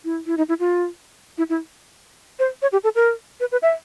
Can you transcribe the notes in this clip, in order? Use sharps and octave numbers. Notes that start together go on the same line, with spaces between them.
E4
E4
D#4
E4
F4
E4
E4
C5
C#5
G4
A4
A#4
B4
B4
E5